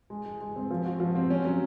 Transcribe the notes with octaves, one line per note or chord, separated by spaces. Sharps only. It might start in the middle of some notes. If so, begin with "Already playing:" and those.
G#3
G#3
G#3
C4
F3
F#4
F3
C4
C#4
F#3